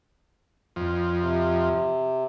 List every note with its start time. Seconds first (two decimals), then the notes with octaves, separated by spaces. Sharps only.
0.76 F2
1.21 C3